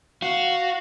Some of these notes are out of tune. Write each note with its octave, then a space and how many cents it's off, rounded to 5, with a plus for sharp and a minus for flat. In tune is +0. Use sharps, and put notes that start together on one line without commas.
F#4 +0 F5 +0